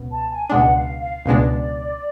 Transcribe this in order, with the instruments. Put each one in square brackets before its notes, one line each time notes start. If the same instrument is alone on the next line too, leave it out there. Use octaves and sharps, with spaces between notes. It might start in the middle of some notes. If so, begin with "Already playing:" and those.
Already playing: [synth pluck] C#2 B2
[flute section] A5
G#5
[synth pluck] C#2 B2 G#3 D4 [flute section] F#5
[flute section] F5
F5
[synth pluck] C#2 B2 G#3 D4 [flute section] D5